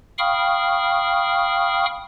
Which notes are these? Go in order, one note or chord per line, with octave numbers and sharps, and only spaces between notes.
F5 G5 B5 C#6 D#6 F6